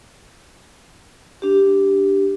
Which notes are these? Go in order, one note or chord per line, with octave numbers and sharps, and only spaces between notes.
D4 G4